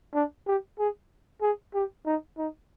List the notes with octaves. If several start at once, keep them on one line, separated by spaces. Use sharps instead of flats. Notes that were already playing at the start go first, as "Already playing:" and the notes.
D4
G4
G#4
G#4
G4
D#4
D#4